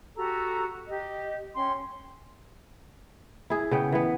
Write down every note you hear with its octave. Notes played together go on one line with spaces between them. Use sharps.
F#4 G4 A4 A#5
G4 D#5
C#4 G5 C6
E4 G#4
C#3 B3 G5
E3 B3